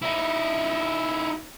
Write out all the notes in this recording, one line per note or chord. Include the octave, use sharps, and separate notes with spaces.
D#4 E4